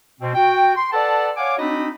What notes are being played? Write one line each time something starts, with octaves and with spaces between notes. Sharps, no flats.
B2 C4
F#4 G5
C6
A4 B4 D5 F#5 A5
C#5 F5 F#5 G#5 D6
C4 D4 D#4 F#4 D#5 B5